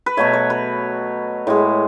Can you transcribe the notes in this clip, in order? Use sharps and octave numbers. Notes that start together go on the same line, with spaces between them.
B4
B2 F#3 A3 C#5
C#5
B4
A2 G#3